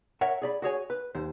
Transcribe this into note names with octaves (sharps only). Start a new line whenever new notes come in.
A#4 C#5 E5 F#5
G#4 D5 B5
F#4 G#4 C#5 G#5
B4
D#2 C5